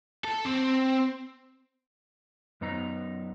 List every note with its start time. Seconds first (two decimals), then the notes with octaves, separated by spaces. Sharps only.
0.24 A4
0.45 C4
2.61 F#2 B3 D#4 A#5